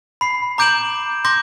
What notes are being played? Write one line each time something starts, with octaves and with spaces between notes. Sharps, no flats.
B5 C7
A#5 D6 G6 D7 E7 F#7
C6 D6 G6 A#6